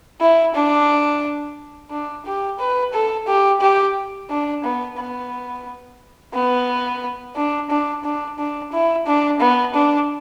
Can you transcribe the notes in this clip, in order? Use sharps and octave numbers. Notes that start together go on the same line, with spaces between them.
E4
D4
D4
G4
B4
A4
G4
G4
D4
B3
B3
B3
D4
D4
D4
D4
E4
D4
B3
D4